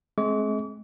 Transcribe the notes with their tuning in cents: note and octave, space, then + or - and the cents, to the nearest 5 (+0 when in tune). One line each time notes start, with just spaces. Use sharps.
G#3 +35 C4 +25 D6 -40